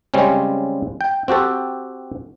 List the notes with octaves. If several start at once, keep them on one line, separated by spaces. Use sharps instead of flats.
C#3 G3 G#3 C4 C#4
G5
C4 F#4 G4 A4